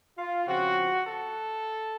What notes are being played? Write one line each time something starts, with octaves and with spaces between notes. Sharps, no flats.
F4
C#3 F3 C4 F#4
A4